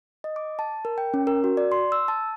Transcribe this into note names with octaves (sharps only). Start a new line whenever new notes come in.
D#5
D6
A5
A#4
G5
C#4
A#4
F#4
D5
C6
E6
A5